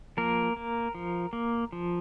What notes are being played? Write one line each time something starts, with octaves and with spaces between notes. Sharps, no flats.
F3 A#3 A#4
A#3
F3
A#3
F3